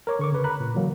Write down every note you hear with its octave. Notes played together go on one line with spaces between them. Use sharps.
A#4 C#5 D6
D3 C#6 D6
C#3 B4
A#5 B5 F#6
A#2
D3 E3 F#3 A#3